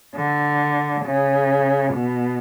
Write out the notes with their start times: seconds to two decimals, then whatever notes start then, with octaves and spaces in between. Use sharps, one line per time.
0.15 D3
1.05 C#3
1.94 B2